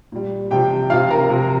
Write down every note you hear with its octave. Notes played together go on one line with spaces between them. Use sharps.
A#2 G3
C3 F3 G4 G5
C3 F3 F4 F5
A#4 A#5
C3 F3